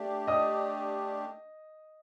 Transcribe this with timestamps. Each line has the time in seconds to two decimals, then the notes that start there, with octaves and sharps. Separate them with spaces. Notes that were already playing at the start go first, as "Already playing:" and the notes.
Already playing: A3 D4 G4
0.28 D#5 D#6